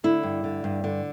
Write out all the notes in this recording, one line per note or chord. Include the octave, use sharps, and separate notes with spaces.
D3 E4
G2
D3
G2
D3